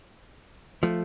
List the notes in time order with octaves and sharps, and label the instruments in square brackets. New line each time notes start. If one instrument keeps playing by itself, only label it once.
[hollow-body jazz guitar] F3 A3